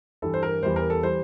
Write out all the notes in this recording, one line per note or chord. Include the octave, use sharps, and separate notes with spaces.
G2 E3 G3 A4
C5
A#4
E2 E3 G3 C5
A#4
A4
E3 G3 C5